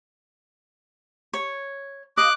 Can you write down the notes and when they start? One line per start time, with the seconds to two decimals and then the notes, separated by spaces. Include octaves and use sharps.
1.33 C#5
2.17 D#5 F5 D6 F#6